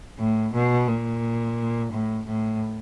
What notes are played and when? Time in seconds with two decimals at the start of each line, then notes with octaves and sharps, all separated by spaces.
0.19 A2
0.54 B2
0.88 A#2
1.92 A2
2.26 A2